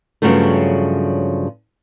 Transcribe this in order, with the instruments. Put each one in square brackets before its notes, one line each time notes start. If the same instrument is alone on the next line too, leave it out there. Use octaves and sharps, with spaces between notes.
[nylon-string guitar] G2 C#3 F3 F#3 A3